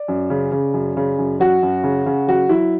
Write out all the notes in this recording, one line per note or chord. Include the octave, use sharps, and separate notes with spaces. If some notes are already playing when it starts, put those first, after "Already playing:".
Already playing: D5
F#2
C#3
C#3
F#2
C#3
F#2
F#3 F#4
F#2
C#3
C#3
F#3 F#4
F#3 E4